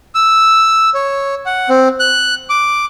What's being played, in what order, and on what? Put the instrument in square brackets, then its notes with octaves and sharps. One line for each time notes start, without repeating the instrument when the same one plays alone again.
[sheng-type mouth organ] E6
C#5
F#5
C4
F#6
D6